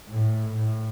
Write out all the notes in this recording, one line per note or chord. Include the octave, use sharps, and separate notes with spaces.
A2
A2